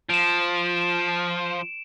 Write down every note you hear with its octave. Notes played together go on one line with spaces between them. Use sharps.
F3 D7 E7